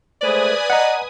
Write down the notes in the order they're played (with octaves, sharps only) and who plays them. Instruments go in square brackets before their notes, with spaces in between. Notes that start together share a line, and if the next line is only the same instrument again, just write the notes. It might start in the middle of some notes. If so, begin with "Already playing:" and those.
[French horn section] G#3 A3 C5 [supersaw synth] B4 G#5 D#6 [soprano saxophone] D5
[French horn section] D#5 [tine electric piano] F#5 A#5